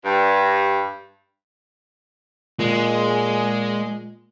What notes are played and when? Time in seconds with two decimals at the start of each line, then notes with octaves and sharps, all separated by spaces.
0.05 G2
2.59 A#2 G#3